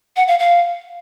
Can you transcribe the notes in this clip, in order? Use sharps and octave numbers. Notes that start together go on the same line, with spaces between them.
F#5
F5
F5